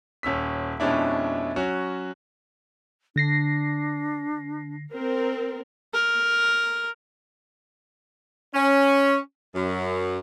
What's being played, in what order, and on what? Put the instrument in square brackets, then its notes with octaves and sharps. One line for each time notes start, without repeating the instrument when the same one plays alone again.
[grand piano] D#1 C#4 E6 B6
F2 B2 G#3 C#4 D4 E4
F#3 C#4 F#4
[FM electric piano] D3 A#6 C7 [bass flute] D4
[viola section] C4 A#4
[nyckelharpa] A#4
[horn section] C#4
F#2